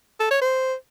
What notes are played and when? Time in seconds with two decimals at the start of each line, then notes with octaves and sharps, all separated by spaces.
0.20 A4
0.30 C#5
0.41 C5